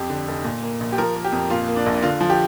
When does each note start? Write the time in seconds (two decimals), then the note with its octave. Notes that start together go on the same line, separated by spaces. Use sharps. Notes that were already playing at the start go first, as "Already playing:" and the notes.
Already playing: F2 G4
0.10 D3
0.28 F1
0.44 A#2
0.63 A#3
0.80 A#1
0.92 G4
0.98 F3 A#4
1.15 A#3
1.24 G4
1.32 F2
1.50 A#2 F4
1.68 A#3
1.76 D4
1.86 A#1
2.02 D3 F4
2.21 F3
2.30 G4